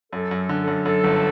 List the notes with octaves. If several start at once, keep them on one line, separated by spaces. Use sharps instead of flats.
F#2 A4
F#2
A4
D3
A4
F#2
F#2 A4
G1